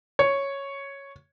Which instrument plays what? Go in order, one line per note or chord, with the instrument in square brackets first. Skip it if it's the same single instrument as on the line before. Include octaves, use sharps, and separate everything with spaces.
[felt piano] C#5